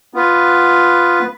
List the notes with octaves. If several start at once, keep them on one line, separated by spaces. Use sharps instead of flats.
B3 F4 B4